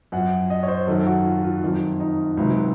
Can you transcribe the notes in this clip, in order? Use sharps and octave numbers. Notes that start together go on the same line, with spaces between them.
F#2 F3 F#5
D#5
C#5
C5
F#2 D#3 F#3 A4
F#4
F4
F4
F2 D#3 F#3 F4
D#4
C#2 C3 D#3 F#3